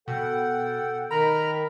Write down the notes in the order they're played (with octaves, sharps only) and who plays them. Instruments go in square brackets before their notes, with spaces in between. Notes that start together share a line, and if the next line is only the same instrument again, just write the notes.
[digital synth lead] B2 [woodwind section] A4 G5 [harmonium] F#5
[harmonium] D#3 [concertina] A#4 A#5 [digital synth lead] B5